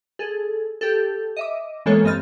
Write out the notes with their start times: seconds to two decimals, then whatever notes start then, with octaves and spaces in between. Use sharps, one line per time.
0.19 G#4 A4
0.81 G4 A4
1.37 D#5 E5 D6
1.86 E3 G#3 A#3 B3 A4 C#5
2.04 G2 B3 C4 D#5 F6 A6